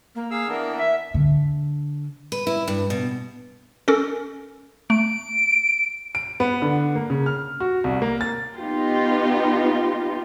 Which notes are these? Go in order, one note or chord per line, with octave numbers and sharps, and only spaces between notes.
A#3
G#4 F5 E6
E3 B3 D4 A#4
E5
D3
B4
E4
G2
B2
C#4 A4 A#4
A3 D7
D7
B3
D3
A#3
C#3
F6
F#4
C2
A#3
A6
B3 D#4 F4 G4